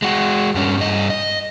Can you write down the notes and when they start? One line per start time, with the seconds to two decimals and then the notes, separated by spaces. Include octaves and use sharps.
0.02 G#3 F#4
0.55 G2 C#4
0.78 G2 D#5
1.10 D#5